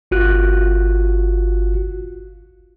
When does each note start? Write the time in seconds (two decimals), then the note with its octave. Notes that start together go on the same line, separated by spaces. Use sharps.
0.11 G1 F4 F#4 F#6